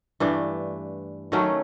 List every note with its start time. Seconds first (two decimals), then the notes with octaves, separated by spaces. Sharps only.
0.20 G2 E3 A3 D4
1.32 D#3 F#3 A3 C#4